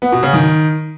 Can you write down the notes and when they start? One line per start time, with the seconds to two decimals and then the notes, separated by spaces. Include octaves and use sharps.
0.02 B3
0.12 B2
0.23 C#3
0.33 D#3